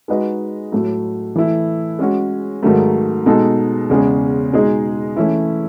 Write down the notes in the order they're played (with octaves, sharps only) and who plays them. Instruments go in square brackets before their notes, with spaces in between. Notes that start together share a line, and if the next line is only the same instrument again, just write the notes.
[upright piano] G#3 D#4 F#4 B4 D#5
A2 F#3 A3
E3 A3 E4
G#3 C#4 F#4
G#2 D#3 F#3 A3
B2 G#3 D#4 A4
E2 C#3 G#3 C#4 G#4
B2 G#3 D#4 G#4 D#5
E3 A3 C#4 E4